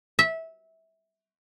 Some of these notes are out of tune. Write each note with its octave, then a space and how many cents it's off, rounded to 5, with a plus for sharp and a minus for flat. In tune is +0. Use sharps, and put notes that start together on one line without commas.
E5 -20